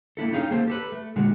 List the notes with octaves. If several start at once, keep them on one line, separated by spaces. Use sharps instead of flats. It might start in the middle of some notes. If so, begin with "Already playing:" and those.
A#3 D4 E4 A4
C#4 D#4 G#4 F5 G5
A#3 A4 C5
G4 A4 B4
A3
A#2 D3 G#3 F#4